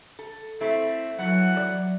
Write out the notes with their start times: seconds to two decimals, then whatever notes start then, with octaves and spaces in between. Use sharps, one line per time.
0.19 A4
0.61 A3 C4 E4
1.19 E3 F#3 A3 F#5
1.57 D5